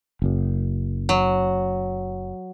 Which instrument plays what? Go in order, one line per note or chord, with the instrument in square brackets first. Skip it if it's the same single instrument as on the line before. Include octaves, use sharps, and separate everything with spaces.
[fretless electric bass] F#1 F#2
[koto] F#3